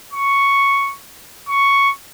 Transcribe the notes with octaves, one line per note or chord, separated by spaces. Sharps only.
C#6
C#6